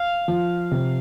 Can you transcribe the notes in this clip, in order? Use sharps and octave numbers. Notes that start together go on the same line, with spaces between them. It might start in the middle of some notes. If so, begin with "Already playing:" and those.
Already playing: F5
F3
C3